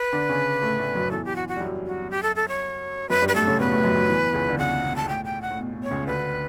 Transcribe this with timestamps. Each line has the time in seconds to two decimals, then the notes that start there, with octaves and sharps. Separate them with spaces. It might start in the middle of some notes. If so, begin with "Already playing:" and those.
Already playing: B4
0.13 D3 D4
0.29 C#3 C#4
0.62 A2 A3
0.78 A2 A3
0.95 F#2 F#3
1.11 E2 E3 A4
1.25 G4
1.36 F#4
1.48 F#4
1.56 G3
1.61 F#2 F#3
1.87 F#4
2.11 G4
2.23 A4
2.36 A4
2.48 C#5
3.09 F#2 F#3 B4
3.22 G2 G3
3.28 B4
3.35 A2 A3 A4
3.47 C#3 C#4
3.60 B2 B3 B4
3.72 A2 A3
3.84 F#2 F#3
3.96 F#2 F#3
4.09 E2 E3
4.33 C#2 C#3
4.49 D3
4.58 C#2 C#3 F#5
4.83 B2
4.96 A5
5.08 A2 G5
5.25 G5
5.42 F#5
5.50 A2
5.58 B2
5.74 B2
5.83 C#5
5.91 C#2 C#3
6.07 D2 D3 B4